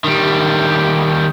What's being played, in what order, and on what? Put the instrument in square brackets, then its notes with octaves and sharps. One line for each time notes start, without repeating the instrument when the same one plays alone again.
[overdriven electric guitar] D#3 G3